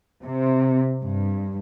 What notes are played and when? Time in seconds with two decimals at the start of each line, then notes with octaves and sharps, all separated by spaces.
0.22 C3
1.03 G2